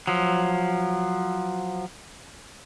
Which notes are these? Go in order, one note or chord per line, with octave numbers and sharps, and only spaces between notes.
F3 F#3